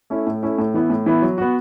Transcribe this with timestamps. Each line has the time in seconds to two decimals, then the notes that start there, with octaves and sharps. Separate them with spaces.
0.10 A3 C#4 E4
0.27 A2
0.43 A3 C#4 E4
0.58 A2
0.74 E3 B3 E4
0.90 A2
1.06 E3 B3 E4
1.22 F#3
1.38 B3 F#4